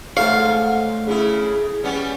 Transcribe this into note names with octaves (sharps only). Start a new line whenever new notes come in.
G#2 A3 A4 C#5 F5
C#3 E4 G#4
G3 B3 C#4